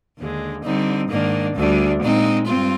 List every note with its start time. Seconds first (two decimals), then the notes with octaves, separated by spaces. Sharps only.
0.18 D#2 D3 G#3
0.64 D3 G3 C4 D#4
1.09 G#2 D#3 A#3 D4
1.54 D2 D3 G3 D4
2.00 A#2 G#3 C4 D#4
2.46 G2 C4 F4